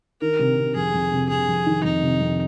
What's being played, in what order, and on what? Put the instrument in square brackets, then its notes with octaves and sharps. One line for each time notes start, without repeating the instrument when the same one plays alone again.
[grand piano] D#3 [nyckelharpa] A#4
[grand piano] C3
C3
[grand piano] F2 [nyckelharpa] G#4
[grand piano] F2
C3
[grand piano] C3 [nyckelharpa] G#4
[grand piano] F2
D#3
[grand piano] F2 [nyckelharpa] D#4
[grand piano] C3
F2